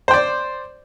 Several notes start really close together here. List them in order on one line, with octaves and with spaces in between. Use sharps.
C5 G5 D5